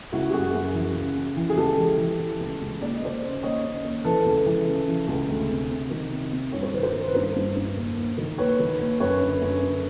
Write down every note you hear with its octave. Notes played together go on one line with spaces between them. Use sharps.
C#2 E4 F#4
G4
F#2 F#4 G#4
F#2
E3
C#3
C#3
E3
G#4
C#2 G4 A4
E3
E3
E3
C#2
C#2
D#2 D5
D#5
D#2 C5 D5
C#3
D#2 C#5 D#5
C#3
D#2
E3 A4 B4
C#2
E3
C#3
E3
C#2
D2
C3
C3
D#3
C3
C3
G2 C#5
C5
D#3 B4
A#4 C5
D#3
B4
G2 A#4 C5
G2
G2
D#2
D#2
D#3
D#2 B4 C#5
D#3
D#2
F#2 B4 C#5
D3
F#2
D3